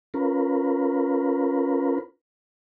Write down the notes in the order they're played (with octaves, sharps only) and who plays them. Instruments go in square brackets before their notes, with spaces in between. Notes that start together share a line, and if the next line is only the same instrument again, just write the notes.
[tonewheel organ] C#4 F4 A#4 B4